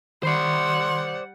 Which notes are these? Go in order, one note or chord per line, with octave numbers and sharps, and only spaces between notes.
D#3 G3 C5 D5 F#5 B5 C6 C7